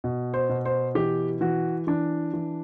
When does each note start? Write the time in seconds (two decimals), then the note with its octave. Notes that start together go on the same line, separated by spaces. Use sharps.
0.04 B2
0.34 C5
0.49 B2
0.65 C5
0.95 E3 G4
1.41 E3 F#4
1.87 E3 D4
2.34 E3